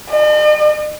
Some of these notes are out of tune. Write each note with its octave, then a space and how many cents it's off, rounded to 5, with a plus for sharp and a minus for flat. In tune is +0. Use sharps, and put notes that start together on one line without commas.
D#5 -45